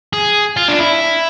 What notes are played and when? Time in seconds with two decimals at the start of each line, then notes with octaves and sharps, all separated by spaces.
0.13 G#4
0.57 F4
0.68 D4
0.79 E4